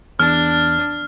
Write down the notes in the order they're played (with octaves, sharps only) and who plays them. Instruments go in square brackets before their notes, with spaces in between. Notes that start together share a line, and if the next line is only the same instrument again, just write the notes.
[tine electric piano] E2 [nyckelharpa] D4 [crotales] F6